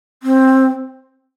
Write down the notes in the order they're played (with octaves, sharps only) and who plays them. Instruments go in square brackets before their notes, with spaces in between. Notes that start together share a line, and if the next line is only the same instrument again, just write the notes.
[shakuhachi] C4